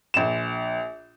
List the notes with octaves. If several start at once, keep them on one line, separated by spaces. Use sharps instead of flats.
A#1 E7